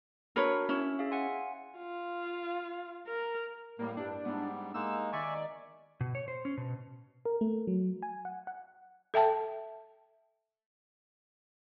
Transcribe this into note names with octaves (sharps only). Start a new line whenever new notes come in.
D4 F#4 A#4 B4 C#5
C#4 E4
G#4 E5 F5
F#5 G#5 C6
F4
A#4
A2 G3 A#3
G2 D4 E4 G4
G#2 G3 B3 E4
G#3 A#3 D#4 E6
D#3 D5 E5 G#5 C#6
B2
C#5
C5
C#4
B2
A#4
A3
F#3
G#5
F#5
F#5
A4 E5 G5 A5